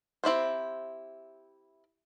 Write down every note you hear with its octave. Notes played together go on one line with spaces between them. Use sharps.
C4 E4 G4 C5